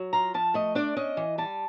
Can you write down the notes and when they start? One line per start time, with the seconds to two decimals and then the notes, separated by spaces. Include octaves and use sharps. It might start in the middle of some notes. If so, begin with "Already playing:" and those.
Already playing: F#3
0.13 F4 A#5
0.34 F3 A5
0.54 A3 D#5
0.75 D4 D5
0.97 C#4 D#5
1.17 E3
1.38 G3 A5